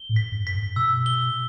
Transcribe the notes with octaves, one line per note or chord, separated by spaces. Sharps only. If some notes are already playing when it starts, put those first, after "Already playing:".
Already playing: G7
A2
B6
G2
B6
G2
B2 E6
G7